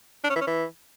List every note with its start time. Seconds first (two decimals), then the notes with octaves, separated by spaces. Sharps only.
0.24 D4
0.30 C#4
0.35 E3
0.41 C#4
0.47 E3